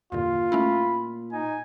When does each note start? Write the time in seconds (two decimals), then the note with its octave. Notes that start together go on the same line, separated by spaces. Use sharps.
0.12 E2 G2 A#2 D3 F4
0.52 A3 C#4 E4 B5
1.32 D#4 G#5